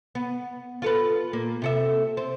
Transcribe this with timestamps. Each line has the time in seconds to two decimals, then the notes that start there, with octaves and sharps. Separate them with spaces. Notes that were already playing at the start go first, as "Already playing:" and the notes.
0.15 B3
0.82 F4 A4 B4
1.33 A#2 A#3
1.62 C3 A4 E5
2.17 C4